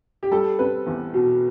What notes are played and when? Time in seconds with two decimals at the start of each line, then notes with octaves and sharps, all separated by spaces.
0.23 G4
0.31 G3 A4
0.59 C4 B4
0.86 E2
1.14 B2